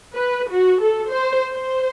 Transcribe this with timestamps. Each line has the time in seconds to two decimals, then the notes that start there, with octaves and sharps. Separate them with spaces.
0.15 B4
0.50 F#4
0.81 A4
1.12 C5
1.53 C5